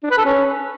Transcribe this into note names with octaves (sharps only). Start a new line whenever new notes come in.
D4
B4
A4
C#4